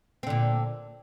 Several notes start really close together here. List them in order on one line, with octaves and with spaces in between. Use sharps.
C4 D3 A#2